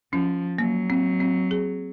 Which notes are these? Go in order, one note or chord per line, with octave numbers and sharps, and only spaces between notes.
F3 C#4
F#3 A#3
C4
C4
G#4